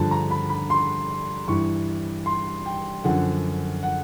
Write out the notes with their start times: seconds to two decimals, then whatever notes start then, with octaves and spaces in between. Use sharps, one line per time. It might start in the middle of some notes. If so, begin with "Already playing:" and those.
Already playing: G2 D3 F3 A5
0.11 A#5
0.31 B5
0.49 B5
0.70 C6
1.48 G2 E3 C#6
2.26 C6
2.66 G5
3.04 F#2 D3 F3 F#5
3.83 F#5